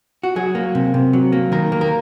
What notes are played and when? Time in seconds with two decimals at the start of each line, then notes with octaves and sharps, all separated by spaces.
0.24 F#4
0.36 F#3 G#4
0.55 A#3
0.75 C3
0.94 C3
1.13 F#3
1.32 A#3
1.52 D#3 A#4
1.72 A#3
1.81 A#4